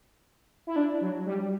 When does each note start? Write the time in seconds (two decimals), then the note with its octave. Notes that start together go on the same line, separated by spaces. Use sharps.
0.67 E4
0.76 D4
1.01 F#3
1.26 G3